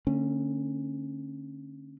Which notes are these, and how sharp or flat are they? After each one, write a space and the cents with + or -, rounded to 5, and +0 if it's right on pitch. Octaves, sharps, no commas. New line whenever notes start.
D3 +0 A3 +45 C#4 -25